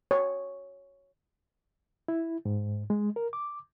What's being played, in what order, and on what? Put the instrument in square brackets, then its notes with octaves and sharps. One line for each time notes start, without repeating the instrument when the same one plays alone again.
[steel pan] C#5
[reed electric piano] E4
G#2
G#3
A#4
D6